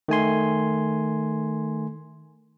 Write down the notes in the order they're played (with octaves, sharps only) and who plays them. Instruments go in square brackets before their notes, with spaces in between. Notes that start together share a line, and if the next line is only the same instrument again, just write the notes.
[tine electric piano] D#3 A3 G#5 C6